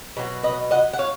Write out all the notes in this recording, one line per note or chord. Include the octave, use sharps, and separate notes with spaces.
B2 F#3
B4 D#5
D#5 F#5
F#5
C#5 F5